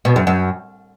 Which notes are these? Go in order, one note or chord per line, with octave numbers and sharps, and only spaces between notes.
B2
F#2
F#2